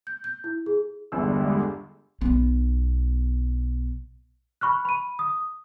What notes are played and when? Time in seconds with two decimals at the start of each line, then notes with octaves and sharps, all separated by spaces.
0.07 G6
0.24 G6
0.44 E4
0.66 G#4
1.12 G1 E2 D3 G3 G#3 E6
2.21 B1 B3
4.61 B5 C#6 F6 F#6
4.85 B5 D#7
5.19 D#6